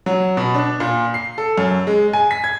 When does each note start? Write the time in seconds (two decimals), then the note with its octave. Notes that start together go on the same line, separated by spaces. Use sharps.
0.06 F#3
0.37 B2
0.54 D4
0.80 A#2
1.14 C7
1.38 A4
1.58 F#2
1.87 G#3
2.13 G#5
2.31 B6
2.44 G#6